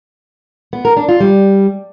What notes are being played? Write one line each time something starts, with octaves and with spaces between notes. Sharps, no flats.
B3
A#4
D4
F4
G3